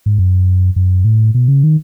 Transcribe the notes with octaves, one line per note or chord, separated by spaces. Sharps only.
G#2
F#2
F#2
A2
B2
C#3
D#3